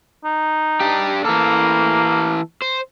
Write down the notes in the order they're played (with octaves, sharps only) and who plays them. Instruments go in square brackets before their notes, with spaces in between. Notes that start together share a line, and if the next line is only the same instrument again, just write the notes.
[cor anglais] D#4
[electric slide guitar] D4 G4
[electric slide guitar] E3 A4 [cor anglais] A#3
[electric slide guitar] C5